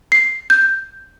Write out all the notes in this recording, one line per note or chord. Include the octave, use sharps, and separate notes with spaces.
C7
G6